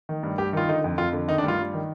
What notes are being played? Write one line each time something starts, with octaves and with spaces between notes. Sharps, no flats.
D#3
G2
G2 G4
D#3 F4
D3 D#4
F2
F2 F4
D3
D#3 D#4
D4
G2 F4
G2
D#3